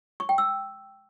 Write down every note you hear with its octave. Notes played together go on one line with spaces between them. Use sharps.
C#6
G5
E6